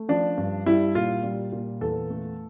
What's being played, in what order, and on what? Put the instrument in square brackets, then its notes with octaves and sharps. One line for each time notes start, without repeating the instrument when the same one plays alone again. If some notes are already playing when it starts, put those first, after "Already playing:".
Already playing: [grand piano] A3
F3 D4
G2
G3 E4
A#2 F4
G3
A#2
E2 A4
A3